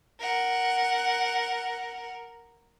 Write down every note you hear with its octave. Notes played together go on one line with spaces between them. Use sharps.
A#4 F#5